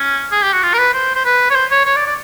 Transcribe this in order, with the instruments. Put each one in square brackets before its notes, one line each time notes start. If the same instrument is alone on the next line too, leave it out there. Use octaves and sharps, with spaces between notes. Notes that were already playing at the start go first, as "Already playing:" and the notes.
Already playing: [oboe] C#4
G#4
G4
F#4
F4
A#4
B4
C5
C5
B4
C#5
C5
C#5
C#5
D5
D5